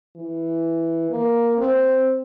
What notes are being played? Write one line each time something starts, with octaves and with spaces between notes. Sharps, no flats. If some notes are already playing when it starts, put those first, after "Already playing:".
E3
A#3
C4